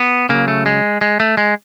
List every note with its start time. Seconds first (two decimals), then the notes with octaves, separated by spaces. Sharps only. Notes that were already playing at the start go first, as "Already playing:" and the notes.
Already playing: B3
0.29 C#3 F#3 A#3
0.48 A3
0.66 G#3
1.01 G#3
1.20 A3
1.37 G#3